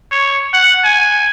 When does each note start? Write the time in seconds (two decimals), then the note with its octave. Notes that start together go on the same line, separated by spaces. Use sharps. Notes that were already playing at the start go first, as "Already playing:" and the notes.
0.12 C#5
0.53 F#5
0.84 G#5